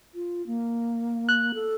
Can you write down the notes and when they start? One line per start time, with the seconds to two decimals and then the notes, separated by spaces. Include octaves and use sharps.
0.14 F4
0.47 A#3
1.29 F#6
1.54 A4